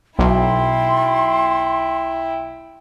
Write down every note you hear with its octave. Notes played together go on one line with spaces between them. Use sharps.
B1 E4 G5 C6